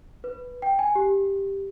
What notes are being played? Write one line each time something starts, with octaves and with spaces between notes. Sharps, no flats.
B4
G5
G#5
G4